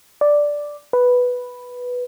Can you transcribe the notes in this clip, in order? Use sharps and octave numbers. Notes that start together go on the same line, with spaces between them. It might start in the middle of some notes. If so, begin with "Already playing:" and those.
D5
B4